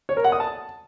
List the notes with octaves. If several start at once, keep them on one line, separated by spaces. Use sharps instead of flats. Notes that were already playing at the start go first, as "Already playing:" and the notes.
C#5
A#4
F#5
D#6
A5